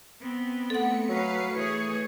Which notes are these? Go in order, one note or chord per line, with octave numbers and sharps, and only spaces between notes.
B3 C4
A3 A4 F#5 C#7
F#3 B4 F5
E3 G#4 C#5